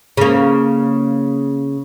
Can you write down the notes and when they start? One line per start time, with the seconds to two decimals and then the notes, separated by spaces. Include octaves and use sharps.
0.17 C#3 A#3